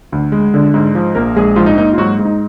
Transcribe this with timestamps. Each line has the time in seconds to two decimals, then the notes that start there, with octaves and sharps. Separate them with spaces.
0.12 D2
0.32 G#3
0.54 D3
0.74 G#2
0.95 F3
1.15 A#1 A#3 A#4
1.36 A#1 G#3 G#4
1.56 G#2 F3 F4
1.66 D#4
1.78 A#3 D#4
1.93 F4
1.97 G#2 F#3 F#4
2.19 G#2
2.25 D#4